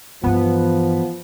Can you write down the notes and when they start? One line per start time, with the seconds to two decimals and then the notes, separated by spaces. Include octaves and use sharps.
0.23 G2 E3 F3 B3